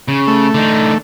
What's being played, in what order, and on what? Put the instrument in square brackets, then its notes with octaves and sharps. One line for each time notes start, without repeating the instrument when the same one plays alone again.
[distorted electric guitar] C#3
[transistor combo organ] A3
[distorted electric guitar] D3 D#4